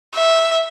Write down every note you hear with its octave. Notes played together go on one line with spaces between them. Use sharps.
E5